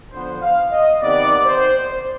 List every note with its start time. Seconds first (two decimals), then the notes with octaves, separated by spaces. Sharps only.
0.12 D3 F3 B3 C5
0.42 F5
0.72 D#5
1.01 C3 D#3 B3 D5
1.46 C5